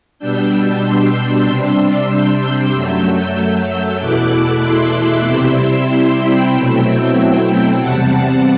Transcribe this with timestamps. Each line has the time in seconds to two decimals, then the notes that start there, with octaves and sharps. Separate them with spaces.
0.19 B2 G3 D4 E6 G6
0.50 E6 G6
0.82 C6 E6
1.45 C3 G3 D4
2.09 E6 G6
2.72 F#2 F#3 A3
3.35 E6 G6
3.99 E2 B2 A3 E4 D6 F#6
4.62 C6 E6
5.26 C3 G3 C4 E4
6.20 G5 B5
6.52 B2 F#3 A3 C4 E4 E5 G5
7.79 E2 C3 G3 C4 F#5 A5